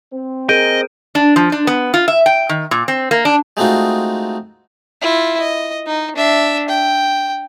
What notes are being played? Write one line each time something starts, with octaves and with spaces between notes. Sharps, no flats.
C4
G#4 A#4 D#5 G6 D7 D#7
D4
F3
D4
B3
F4
E5
G5
D#3
A#2
C4
A#3
D4
G#3 A3 C4 D#4 F4 F#4
E4 F4
D#5
D#4
D4 E5
G5